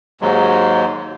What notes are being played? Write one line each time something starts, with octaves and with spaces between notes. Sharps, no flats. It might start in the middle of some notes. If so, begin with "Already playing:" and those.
D#2 G#2 F#3 G#3